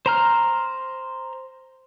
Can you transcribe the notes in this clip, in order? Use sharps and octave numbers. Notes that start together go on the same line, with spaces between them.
C5 A#5 F6